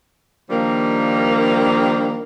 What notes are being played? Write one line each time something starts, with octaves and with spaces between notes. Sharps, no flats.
D#3 F3 G3 A#3 D4